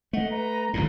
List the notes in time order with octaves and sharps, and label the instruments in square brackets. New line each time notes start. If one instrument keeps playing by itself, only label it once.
[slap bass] A3 [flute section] D#5 F#5
[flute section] B4 A#5
[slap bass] G1 D#2 A2